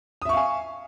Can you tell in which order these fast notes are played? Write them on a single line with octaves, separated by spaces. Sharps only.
D#6 E5 C#6 F5 G#5